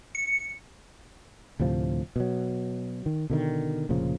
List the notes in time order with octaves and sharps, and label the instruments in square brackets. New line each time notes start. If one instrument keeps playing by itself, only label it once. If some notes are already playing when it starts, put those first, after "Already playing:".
[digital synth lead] C#7
[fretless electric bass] D2 A2 C3 F3
B2 F#3
D#3
B2 D3 D#3
F1 A#2 C#3 F3